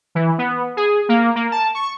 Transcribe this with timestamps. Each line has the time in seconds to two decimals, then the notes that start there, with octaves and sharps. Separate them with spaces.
0.15 E3
0.38 B3
0.77 G#4
1.09 A#3
1.36 A#3
1.52 A5
1.75 C#6